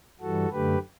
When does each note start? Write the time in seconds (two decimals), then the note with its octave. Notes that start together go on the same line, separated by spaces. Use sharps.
0.21 G2 E3 G3 F#4 A4
0.51 F#2 D3 A3 G4 B4